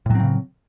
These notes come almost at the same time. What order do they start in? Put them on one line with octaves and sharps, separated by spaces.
A2 F#3 C4 C#3